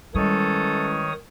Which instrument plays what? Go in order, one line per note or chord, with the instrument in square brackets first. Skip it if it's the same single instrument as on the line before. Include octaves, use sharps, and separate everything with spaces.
[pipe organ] D#3 C#5 D#6 [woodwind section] E3 G#3 C#4 [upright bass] G3 [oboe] A4